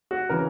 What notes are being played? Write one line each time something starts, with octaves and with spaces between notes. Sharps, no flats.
F#4
C#3 E3 A#4